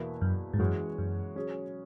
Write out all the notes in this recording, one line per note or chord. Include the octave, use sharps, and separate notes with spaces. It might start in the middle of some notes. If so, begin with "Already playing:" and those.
Already playing: E2 B2 A#3 E4 B4
F#2
G#2
F#2 E3 G#3 C#4 F#4 C#5
F#2
F#3 C#4 G#4